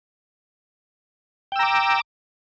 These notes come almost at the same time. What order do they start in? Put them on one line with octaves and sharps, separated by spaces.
G5 E6 A#5 D6